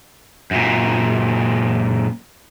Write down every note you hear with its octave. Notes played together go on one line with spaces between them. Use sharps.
F#2 A#2